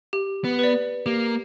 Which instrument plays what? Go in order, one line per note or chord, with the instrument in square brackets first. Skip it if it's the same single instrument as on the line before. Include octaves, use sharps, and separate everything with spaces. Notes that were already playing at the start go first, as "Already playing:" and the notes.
[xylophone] G4
[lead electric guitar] B3
[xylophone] B4 D5
[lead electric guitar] A#3 [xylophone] G4